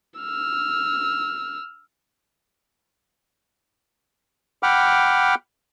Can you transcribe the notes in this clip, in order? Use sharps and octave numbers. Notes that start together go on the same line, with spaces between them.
E6 F6
F#5 G5 B5 D6 F6